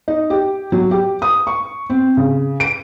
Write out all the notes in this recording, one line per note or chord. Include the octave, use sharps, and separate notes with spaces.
D#4
G4
F#3
G4
D#6
C#6
C4
C#3
D7